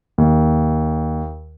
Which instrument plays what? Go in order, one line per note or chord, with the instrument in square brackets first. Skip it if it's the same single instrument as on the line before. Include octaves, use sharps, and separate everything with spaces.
[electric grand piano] D#2